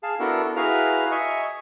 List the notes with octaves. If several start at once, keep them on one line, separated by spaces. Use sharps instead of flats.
G#4 F5 A5
B3 D4 E4 F#4 A4 A#4
E4 F#4 G#4 B4 F5 A#5
D#5 E5 G#5 C#6